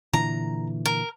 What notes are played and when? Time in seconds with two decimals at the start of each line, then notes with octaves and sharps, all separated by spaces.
0.13 A#2 D3 E3 A#5
0.86 A#4